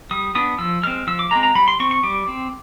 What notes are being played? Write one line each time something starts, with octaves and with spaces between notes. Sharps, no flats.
G3 D#6
B3 D4 D#6
F3 E6
G#3 C4 F6
F3 E6
D6
G#3 C4 A#5
A#5
G3 B5
C6
C4 C#6
C#6
G3 D6
C4